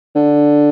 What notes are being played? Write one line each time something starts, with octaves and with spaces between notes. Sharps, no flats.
D3